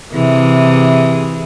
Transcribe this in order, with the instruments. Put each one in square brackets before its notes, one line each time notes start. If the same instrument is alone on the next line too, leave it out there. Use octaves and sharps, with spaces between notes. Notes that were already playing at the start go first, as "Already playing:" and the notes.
[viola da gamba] C3 E3 G#4